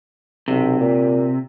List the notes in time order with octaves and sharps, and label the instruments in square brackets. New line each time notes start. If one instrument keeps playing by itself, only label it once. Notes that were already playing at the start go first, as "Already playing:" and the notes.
[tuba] B1 [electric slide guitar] C3
[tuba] A#2